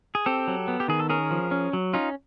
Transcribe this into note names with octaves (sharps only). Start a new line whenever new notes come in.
G#4
C4 G4 A4
F#3
B3
G4
D#3 G#4
A4
C#4 G#4 A#4
F3
C#4
F#3
C#4 D#4 F4